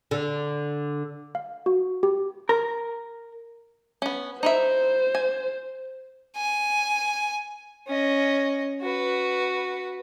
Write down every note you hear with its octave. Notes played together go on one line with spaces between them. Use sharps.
D3
F5
F#4
G4
A#4
B3 C#4
D#4 E4 C5 E5
G#5
G#5
C#4 D#5
F#4 B4